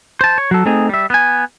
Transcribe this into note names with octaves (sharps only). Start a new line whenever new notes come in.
C5 A5
C#5
F#3 A4
A3 C4 D#4 G#4
G3 E5
B3 G#5